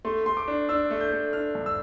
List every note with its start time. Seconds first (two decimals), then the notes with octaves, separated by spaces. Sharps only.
0.05 A3 C6
0.26 A3 C6
0.37 D6
0.48 D4
0.69 D4 E6
0.91 A3
1.01 G6
1.13 A3
1.33 D4 F6
1.55 G2
1.66 E6